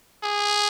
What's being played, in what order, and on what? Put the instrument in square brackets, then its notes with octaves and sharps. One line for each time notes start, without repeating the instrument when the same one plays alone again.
[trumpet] G#4